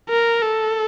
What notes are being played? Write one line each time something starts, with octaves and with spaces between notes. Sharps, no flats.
A#4
A4